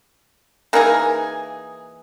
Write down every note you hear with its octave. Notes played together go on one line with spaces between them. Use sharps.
E3 A#3 D#4 G#4